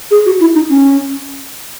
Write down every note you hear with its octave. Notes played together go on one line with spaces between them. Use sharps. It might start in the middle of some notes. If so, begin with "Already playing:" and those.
G#4
F#4
E4
D#4
C#4